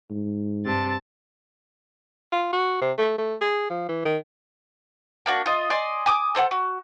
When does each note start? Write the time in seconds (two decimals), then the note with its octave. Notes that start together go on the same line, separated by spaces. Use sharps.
0.10 G#2
0.66 G2 C3 A5 A6
2.32 F4
2.53 F#4
2.81 C3
2.98 A3
3.18 A3
3.41 G#4
3.70 F3
3.89 E3
4.05 D#3
5.26 A#3 D4 F#4
5.46 F4 D#5
5.70 D5 D#5 G#5 C6
6.06 G#5 D6 D#6
6.35 A4 C5 D5 F#5
6.51 F#4